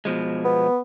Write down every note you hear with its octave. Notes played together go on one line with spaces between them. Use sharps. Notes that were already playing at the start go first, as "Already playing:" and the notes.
B2 F3 G#3
B3